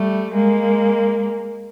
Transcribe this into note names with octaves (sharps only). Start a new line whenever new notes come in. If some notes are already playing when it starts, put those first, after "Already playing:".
Already playing: G3 A3
G#3 A#3